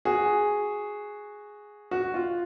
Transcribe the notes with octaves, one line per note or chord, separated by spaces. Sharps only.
F#4 G#4
F#4
F4